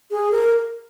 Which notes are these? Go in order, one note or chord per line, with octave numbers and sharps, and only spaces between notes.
G#4
A#4